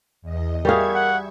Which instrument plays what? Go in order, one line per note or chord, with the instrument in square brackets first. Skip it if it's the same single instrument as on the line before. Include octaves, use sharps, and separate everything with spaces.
[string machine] E2 D#5
[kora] G3 F#4 G#4 [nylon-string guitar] A#4 F5 [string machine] E5 C#6 G#6
[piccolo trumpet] F#5